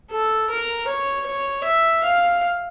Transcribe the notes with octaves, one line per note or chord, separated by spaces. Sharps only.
A4
A#4
C#5
C#5
E5
F5